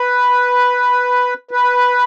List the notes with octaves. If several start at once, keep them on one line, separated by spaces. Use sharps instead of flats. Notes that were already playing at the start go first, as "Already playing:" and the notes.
Already playing: B4
B4